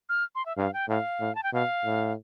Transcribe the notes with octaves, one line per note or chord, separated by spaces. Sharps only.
F6
C6
E5
G2 F5
G5
A2 F5
A2
A5
G5
B2 F5
A2